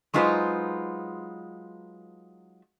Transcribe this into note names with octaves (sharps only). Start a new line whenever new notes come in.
F#3 G#3 D#4 F4 B4 C5